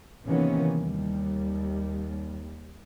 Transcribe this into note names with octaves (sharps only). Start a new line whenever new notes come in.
C3 D#3 E3 A#3 B3 C#4
D#2 G3